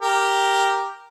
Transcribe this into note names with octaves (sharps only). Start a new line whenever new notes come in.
G4 A#4